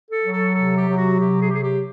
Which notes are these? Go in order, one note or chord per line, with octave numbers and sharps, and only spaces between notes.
A4
F#3
A4
C3 A4
G4
F#3
F#4
C3 G4
G#4
G4
F#3 G#4
G4